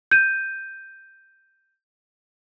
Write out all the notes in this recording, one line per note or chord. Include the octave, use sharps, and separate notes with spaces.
G6 D#7